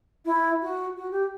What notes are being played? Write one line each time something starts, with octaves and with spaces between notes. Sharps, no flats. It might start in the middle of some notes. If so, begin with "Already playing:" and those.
E4
F#4
F#4
G4